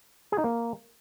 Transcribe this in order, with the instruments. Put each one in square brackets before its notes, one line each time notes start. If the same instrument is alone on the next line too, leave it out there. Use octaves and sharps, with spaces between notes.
[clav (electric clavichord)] G#4
D#4
A#3